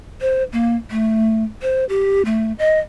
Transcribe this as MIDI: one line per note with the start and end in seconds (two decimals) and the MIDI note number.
0.21 0.43 72
0.52 0.76 58
0.91 1.43 57
1.62 1.85 72
1.89 2.25 67
2.25 2.53 57
2.59 2.79 75